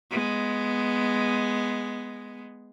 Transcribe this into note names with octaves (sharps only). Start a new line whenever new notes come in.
G#3 B3